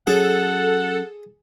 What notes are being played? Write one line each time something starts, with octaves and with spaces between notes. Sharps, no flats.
F#3 C#4 G#4 A4 F#5